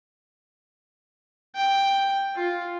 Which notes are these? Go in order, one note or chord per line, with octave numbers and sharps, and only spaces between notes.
G5
F4